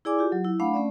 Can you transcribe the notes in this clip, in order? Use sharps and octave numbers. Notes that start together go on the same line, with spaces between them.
E4 G#4 D5 G#5 D6
F4 G4
F#3
E4
A3 D4 F5 F#5 B5
A3 C#4 D5